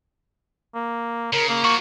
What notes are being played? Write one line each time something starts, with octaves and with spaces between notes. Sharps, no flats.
A#3
C#3 A#4
A#3
F3 F#4 C#6